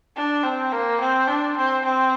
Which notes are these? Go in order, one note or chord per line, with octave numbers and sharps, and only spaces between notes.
D4
C4
A#3
C4
D4
C4
C4